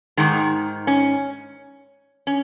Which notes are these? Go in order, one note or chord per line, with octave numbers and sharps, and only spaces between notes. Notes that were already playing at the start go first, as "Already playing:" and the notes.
G#2 D#3 G#3
C#4
C#4